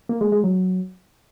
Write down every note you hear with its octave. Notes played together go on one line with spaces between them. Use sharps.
A#3
G#3
G#3
F#3